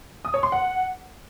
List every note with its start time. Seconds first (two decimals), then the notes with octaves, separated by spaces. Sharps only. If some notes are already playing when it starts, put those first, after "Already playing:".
0.25 D#6
0.34 C#5
0.43 C6
0.52 F#5